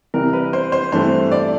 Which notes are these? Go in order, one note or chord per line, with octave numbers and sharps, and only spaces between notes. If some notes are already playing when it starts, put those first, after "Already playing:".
C3 E3 G3 A#4
B4
C5
C5
G2 E3 A3 C4 C5
D5